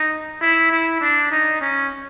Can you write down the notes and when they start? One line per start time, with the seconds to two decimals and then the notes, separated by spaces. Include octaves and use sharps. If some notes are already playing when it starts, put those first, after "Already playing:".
Already playing: D#4
0.41 E4
0.71 E4
1.01 D4
1.31 D#4
1.61 C#4